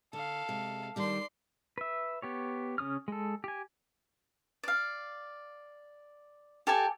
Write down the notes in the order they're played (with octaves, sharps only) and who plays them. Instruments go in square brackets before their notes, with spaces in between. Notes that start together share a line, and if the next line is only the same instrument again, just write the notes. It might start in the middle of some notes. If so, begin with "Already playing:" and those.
[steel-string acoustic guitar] D3 [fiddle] A4 F5
[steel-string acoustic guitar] C3 G#3
[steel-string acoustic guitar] D#3 G3 D4 [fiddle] D5 C6
[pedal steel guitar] B4 E5
B3 G4 C#5
C#3 C#4 D#6 F6
G#3 A4
G4 G#5
[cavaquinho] D5 F5
G4 A4 D5 G#5